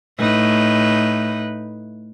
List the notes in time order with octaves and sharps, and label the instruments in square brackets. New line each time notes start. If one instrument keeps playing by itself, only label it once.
[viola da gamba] A2 D#4 B4